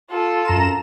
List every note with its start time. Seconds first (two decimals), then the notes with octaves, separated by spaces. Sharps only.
0.10 F4 A4
0.45 F#2 A#5 E7